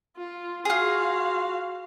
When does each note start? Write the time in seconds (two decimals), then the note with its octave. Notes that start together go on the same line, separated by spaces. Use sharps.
0.17 F4
0.65 F4 F#4 G#4 F5